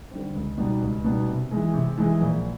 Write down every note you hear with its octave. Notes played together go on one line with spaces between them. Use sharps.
D3 G3 C4
C#2
B2 G3 B3 D#4
C#2
B2 G3 B3 D#4
C3
E3 G#3
C3
E3 G#3
A#1